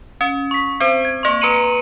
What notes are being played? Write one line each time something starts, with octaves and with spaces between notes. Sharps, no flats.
C#4
C#6 B6
C4 C5
G#6
A#3 C#6
B4 A#5 C6 C#7 D#7 F#7